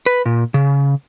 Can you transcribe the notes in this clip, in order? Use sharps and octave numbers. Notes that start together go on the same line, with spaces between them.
B4
A#2
C#3